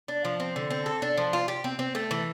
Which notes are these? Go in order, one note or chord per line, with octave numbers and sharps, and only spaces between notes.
D4
F3
C4
D3
C4
A4
D4
F3
F4
G4
C4
C4
A3
E3